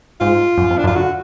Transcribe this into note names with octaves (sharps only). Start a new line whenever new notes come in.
G#2 F4
F#2
F2
D4
F#2
F4
D3 F#4